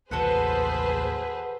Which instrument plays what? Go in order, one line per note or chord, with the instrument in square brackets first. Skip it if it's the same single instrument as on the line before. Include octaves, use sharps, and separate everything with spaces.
[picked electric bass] A1 D#2 [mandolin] F#4 A4 F#5 [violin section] G#4 B4 C5